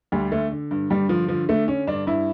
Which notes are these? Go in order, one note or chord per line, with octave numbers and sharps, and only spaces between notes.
D2 G3
D3 A3
D3
G2
G2 G3
D3 F3
D3 F3
D3 A3
D3 C#4
G2 D4
G2 E4